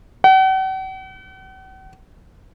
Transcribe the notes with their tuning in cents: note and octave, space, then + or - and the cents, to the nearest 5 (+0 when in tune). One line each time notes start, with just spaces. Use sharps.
F#5 +45